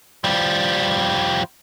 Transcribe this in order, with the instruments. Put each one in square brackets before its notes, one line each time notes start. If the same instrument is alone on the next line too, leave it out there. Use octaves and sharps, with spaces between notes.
[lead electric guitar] F3 G3